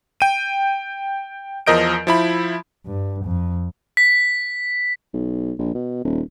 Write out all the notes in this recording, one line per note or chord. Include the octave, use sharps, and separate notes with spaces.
G5 D#7
E2 F3 A#4 D#5 G6 D7
F3 E4 B5
G2
F2
B6
B1
A#1
B2
D#1